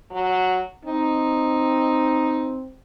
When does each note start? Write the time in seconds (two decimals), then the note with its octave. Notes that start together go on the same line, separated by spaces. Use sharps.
0.11 F#3
0.85 C4 D#4